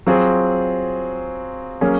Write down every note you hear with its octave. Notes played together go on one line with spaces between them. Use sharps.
F#3 C4 F4 G#4
F#3 A#3 C#4 G#4